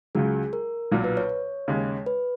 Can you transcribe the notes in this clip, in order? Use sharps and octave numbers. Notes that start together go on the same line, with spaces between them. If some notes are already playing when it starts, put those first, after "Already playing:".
C#2 C#3 F#3 G#4
A#4
B1 A#2 F#3
B4
C#5
C#5
D#2 C#3 G#3
B4